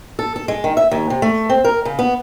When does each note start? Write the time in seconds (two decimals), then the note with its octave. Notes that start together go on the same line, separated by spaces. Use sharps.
0.19 A4
0.36 A4
0.48 G#3
0.64 D#3
0.77 E5
0.91 D#2
1.10 C3
1.22 A3
1.50 C4
1.64 A#4
1.85 C#3
1.99 B3